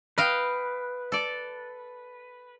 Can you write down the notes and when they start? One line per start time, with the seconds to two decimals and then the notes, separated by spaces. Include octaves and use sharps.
0.18 B4 D#5 F5 G5
1.12 A4 D5